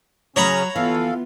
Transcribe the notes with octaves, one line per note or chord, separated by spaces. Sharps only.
C#3 F#3 C#4 C#5 A#5 B5 D#6
E3 B3 F4 A4 F5